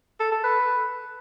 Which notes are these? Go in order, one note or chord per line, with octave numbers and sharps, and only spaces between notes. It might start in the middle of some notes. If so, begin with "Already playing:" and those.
A4
A4
B4